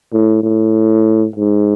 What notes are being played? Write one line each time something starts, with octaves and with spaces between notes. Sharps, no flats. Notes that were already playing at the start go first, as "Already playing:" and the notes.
A2
A2
G#2